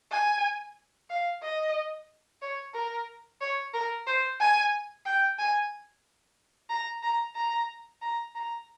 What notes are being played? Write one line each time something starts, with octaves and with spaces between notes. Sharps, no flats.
G#5
F5
D#5
C#5
A#4
C#5
A#4
C5
G#5
G5
G#5
A#5
A#5
A#5
A#5
A#5